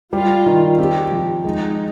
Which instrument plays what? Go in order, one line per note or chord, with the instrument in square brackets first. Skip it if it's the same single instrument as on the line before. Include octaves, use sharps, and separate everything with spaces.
[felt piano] G3 [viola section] F4
[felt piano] D#3
[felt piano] C4 [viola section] G4
[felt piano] F3
[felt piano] G#3 [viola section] D#4